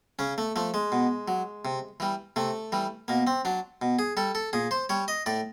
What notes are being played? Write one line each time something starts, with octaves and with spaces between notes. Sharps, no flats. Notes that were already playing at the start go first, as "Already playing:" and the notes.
C#3 C#4
A3
F3 A3
G#3
B2
F#3
C3
E3 G3
C3 A3
E3 G3
B2 A#3
C4
F#3 D4
B2
G#4
G3 A4
A4
A#2 G#4
C5
G3 C#5
D#5
A2 D5